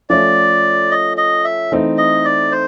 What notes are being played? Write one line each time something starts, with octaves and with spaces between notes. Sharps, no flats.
F3 A3 C#4 D5
D#5
D#5
E5
E3 A3 C4 D#4
D#5
D5
C5